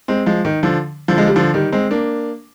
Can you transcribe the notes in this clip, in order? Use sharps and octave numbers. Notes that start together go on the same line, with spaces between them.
G#3 C4
F3 G#3
D#3
D3 F3
D3 F3
G#3
G3
D3 F3
D#3 G3
G#3 C4
A#3 D4